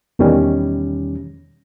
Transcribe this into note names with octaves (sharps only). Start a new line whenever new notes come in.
E2 B2 D#3 G3 C#4